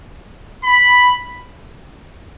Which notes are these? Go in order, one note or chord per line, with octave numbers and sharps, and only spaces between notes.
B5